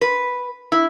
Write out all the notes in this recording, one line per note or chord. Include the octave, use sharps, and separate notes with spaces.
B4
E4